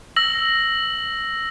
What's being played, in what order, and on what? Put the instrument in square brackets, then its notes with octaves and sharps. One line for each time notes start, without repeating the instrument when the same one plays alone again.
[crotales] E6 A#6 F#7